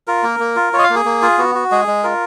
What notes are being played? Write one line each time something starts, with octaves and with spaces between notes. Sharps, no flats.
F4 A#4
A#3
A#3
F4
F4 C#5
D#5
F5
A#3
G#4
A#3
F4
B3 F#4
F#4
G#3 G#4
G#3
F4 A#4